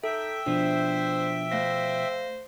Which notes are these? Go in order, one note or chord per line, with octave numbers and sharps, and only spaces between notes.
D#4 A4 E5 G5
B2 F3 D4 C5
A3 C5 F5 A#6